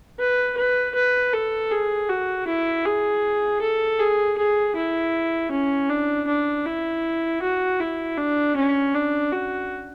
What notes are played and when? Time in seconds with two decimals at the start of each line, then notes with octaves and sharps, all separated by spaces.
0.19 B4
0.57 B4
0.95 B4
1.33 A4
1.71 G#4
2.09 F#4
2.47 E4
2.85 G#4
3.61 A4
3.99 G#4
4.38 G#4
4.76 E4
5.51 C#4
5.89 D4
6.27 D4
6.66 E4
7.42 F#4
7.80 E4
8.18 D4
8.56 C#4
8.94 D4
9.32 F#4